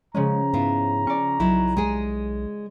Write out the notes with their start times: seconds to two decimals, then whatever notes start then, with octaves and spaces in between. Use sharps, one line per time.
0.15 C#3 F3 G#3 C#4 A#5
0.53 G#2 B3 E4 F4
1.07 C#4 D5 C#6
1.40 B1 F#3 D#4 E4
1.77 G#3 G#4